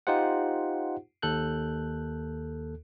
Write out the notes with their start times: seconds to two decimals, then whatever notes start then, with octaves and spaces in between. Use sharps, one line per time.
0.07 D#4 F4 G4 C5 F#5
1.22 D#2 A4 F#6 G6